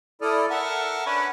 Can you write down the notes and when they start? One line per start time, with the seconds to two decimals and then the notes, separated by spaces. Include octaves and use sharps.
0.22 E4 A4 D5 D#6 F6
0.50 A4 A#4 E5 F#5
1.06 C#4 D4 B4 F#5 B5